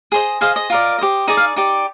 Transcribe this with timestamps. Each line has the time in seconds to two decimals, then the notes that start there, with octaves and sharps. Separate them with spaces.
0.12 G#4 C5 D#5
0.41 G#4 C5 D#5 F5
0.56 D#5
0.70 F4 A#4 D5
0.98 G4 C5 D#5
1.28 D#4 G#4 D5 D#5
1.37 F5
1.56 D#4 G4 D5